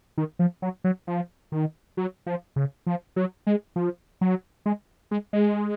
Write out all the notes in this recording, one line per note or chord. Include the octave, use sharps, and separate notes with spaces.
D#3
F3
F#3
F#3
F3
D#3
F#3
F3
C#3
F3
F#3
G#3
F3
F#3
G#3
G#3
G#3